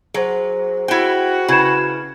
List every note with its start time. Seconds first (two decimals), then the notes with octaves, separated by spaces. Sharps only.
0.14 F#3 G#4 C5
0.88 E4 F#4 G5
1.48 C#3 E4 B4 B5 G#6 E7